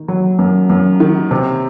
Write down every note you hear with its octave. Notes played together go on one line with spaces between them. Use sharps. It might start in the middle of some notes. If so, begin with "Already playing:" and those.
Already playing: D#3
F#3
F#2
F#2
D#3
C3